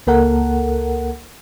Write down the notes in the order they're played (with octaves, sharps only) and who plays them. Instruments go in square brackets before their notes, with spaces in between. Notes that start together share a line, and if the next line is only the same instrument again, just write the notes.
[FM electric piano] C#2 A#3 A4 A#4 F#5